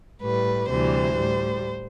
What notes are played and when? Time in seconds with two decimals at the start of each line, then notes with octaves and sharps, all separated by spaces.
0.22 A2 G3 B4
0.69 D2 C3 E3 G3 C5
1.16 A2 G3